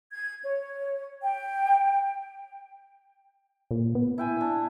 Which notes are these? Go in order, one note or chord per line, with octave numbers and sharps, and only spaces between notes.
G#6
C#5
G5
A#2
B3
E4 G5 G#5
D4